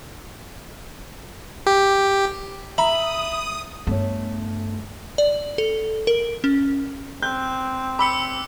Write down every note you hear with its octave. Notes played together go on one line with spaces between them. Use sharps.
G4
E5 A#5 B5 D#6
G2 A3 B3 C#5
D5
A4
A#4
C#4
C4 F#6 G6
B5 D6 E6 C#7